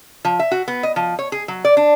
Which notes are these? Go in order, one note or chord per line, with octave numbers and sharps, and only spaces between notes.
F3
E5
F#4
B3
D#5
F3
C#5
G#4
F#3
D5
D4